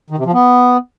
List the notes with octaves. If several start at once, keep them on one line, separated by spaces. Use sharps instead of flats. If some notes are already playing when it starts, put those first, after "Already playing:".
D#3
C3
F3
B3